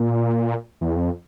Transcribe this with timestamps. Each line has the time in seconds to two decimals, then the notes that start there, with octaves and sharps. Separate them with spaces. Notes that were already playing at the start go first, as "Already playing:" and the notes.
Already playing: A#2
0.81 E2
0.96 F2